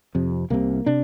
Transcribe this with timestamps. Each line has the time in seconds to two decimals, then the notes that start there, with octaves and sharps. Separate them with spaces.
0.15 F2 C3
0.50 C2 C3 A#3
0.86 C3 D4